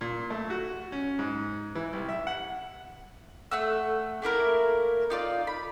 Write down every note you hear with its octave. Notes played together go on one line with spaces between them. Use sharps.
A#2
A3
F#4
C#4
G#2
E3
C2
E5
F#5
A3 F#5 E6
A3 A#3 E4 A#4
D#4 F4 D5
B5